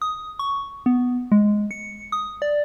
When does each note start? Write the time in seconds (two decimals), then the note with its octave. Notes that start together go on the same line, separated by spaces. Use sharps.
0.02 D#6
0.39 C#6
0.86 B3
1.32 G#3
1.71 C#7
2.12 D#6
2.42 D5